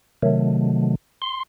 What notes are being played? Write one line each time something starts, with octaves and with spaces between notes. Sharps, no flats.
C3 D#3 F#3 A3
C6